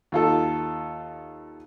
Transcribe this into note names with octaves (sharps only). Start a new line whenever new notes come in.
D#2 F4 A4